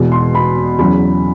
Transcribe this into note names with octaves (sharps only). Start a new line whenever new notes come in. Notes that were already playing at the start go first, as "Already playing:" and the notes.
Already playing: E2 B2 G#3
C6
B5
E2 C#3 F#3 B5